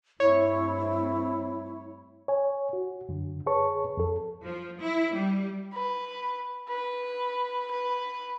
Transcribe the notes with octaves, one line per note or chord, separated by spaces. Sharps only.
G2 A3 C4 E4 C#5
C#5 G#5
F#4
F#2 D3
G#4 B4 C#5 A5 C#6
F2 A4
F3
E4
G3
B4
B4
B4